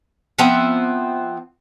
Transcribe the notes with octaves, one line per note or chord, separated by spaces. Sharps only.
F3 B3 C4 E5